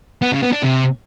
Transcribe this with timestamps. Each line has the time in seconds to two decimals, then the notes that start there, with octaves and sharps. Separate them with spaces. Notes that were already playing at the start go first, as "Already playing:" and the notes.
0.22 B3
0.32 C#3
0.42 B3
0.52 D4
0.63 C3